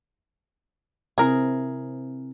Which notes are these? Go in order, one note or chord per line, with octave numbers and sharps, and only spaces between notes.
C3 C4 E4 G#4 A#4